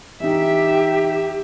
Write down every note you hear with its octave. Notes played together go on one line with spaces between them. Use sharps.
E3 D#4 G4 E5